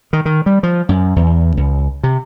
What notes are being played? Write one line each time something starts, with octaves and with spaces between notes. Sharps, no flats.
D#3
D#3
G3
F3
F#2
E2
C#2
C3